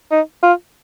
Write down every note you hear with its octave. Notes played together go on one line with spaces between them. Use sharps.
D#4
F4